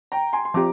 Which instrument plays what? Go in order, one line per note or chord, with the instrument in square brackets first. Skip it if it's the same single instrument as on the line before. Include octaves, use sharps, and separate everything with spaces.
[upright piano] G5 A#5
G#5 C6
C6
[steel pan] F3 C4 G4 [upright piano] A#5 D6